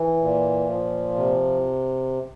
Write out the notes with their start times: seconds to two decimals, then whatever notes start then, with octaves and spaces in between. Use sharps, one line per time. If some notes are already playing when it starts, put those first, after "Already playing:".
Already playing: E3
0.21 A#2
0.68 F3
1.15 C3